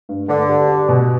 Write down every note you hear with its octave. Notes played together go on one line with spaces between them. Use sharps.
G2
G2 D3
G4
G4
B2